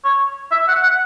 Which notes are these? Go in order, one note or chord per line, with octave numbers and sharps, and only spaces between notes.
C#5
E5
F#5
F#5